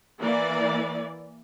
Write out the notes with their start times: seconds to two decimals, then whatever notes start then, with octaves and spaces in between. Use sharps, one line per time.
0.21 E3 A#3 D5